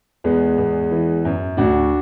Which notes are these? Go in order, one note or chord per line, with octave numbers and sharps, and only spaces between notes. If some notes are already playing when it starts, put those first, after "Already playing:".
E2 G#3 B3
E2
E3
F#2
D2 D4 F#4